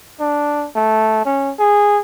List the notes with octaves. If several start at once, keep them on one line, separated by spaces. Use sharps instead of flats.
D4
A3
C#4
G#4